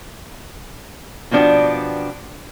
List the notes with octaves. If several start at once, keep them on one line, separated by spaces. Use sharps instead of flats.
B2 F3 B3 D4 G4